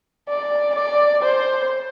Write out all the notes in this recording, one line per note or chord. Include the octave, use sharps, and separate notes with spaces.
D5
D5
C5